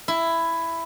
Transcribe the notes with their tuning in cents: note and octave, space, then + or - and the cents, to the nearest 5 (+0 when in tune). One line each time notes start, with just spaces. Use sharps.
E4 +10